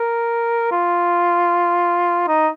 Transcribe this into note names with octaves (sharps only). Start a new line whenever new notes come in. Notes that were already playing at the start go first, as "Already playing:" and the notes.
Already playing: A#4
F4
D#4